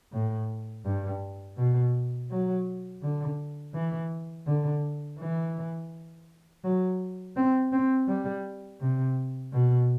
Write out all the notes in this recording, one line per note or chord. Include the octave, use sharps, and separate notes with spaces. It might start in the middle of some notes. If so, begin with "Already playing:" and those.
A2
G2
B2
F#3
D3
E3
D3
E3
F#3
C4
C4
G3
C3
B2